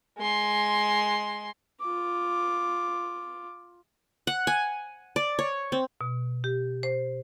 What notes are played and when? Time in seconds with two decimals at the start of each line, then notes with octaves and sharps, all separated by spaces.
0.18 G#3 C6
1.81 F4 D6
4.27 F#5
4.47 G#5
5.16 D5
5.39 C#5
5.72 C4
6.01 B2
6.44 G4
6.83 C5